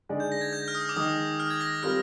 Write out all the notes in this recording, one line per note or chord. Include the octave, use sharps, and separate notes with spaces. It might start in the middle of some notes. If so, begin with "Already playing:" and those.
D3 G#3 D#4 G#4 D5
G6
A#6
G#6
G6
F6
D#6
D6
D#3 G#3 D#4 D#6
F6
G#6
A#6
G3 C4 F4 A#4 F6